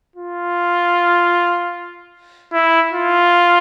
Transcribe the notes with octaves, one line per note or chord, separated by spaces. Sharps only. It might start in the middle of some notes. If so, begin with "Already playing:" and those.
F4
E4
F4